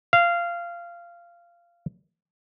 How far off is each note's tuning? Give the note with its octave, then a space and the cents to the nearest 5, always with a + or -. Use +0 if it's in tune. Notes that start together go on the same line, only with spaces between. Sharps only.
F5 -15